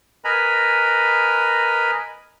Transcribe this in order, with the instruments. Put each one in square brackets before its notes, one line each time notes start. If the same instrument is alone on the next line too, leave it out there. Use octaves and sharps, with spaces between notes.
[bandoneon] A#4 B4 D#5 G#5 A#5 B5